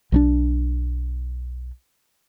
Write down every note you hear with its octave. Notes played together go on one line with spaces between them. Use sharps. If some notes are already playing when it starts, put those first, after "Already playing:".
B1 F#3 D4